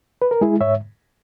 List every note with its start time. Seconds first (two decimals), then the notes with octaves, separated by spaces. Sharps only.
0.22 B4
0.31 A#4
0.41 G#3 E4 G#4
0.61 G#2 C#5 E5